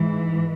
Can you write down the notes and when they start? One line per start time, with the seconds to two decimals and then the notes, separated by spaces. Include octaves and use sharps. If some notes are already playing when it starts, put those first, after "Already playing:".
Already playing: G#2 E3